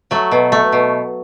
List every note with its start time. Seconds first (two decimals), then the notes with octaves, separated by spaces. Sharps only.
0.11 F#3 A3
0.32 B2
0.52 A3
0.72 B2